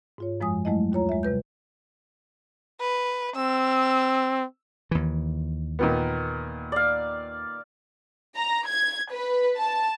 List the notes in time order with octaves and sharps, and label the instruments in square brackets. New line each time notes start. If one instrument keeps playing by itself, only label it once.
[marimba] G#2 F4 C#5
F#2 F3 G#3 G#5 D#6
F#3 G#3 A3 E4 D#5
D#2 F4 C#5 A#5
G#3 E5
C3 G3 B4 G6
[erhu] B4
[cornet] C4 [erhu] E6
[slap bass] D#2 E3
[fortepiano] A#2 D#3 B3
[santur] D5 F5
[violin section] A#5
G#6
B4
A5